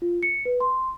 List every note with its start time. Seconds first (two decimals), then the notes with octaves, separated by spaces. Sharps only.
0.02 F4
0.23 C#7
0.45 B4
0.60 C6